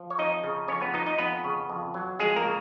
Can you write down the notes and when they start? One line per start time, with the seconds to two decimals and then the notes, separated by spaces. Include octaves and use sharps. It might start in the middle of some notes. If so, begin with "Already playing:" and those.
Already playing: F3
0.10 C#5
0.19 F2 D#4 D#5
0.44 C#3
0.68 F2 C#4 C#5
0.81 B3 B4
0.94 F3 D#4 D#5
1.06 D#4 D#5
1.18 F2 B3 B4
1.44 C#3
1.69 F2
1.94 F#3
2.19 F2 G#3 G#4
2.36 A#3 A#4
2.44 C#3